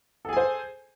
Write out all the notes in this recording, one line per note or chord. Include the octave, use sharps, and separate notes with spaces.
G#4 A4 C5 G#5